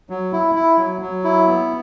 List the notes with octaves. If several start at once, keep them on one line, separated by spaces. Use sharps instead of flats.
F#3
E4
E4
F#3
F#3
E4
B3